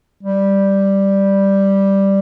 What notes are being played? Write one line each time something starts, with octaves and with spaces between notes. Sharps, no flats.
G3